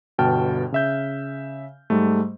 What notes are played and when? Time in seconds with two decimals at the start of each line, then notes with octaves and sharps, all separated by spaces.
0.18 G1 B2 G5 A5 F6
0.72 C#3 E5 G6
1.90 G#2 G3 A3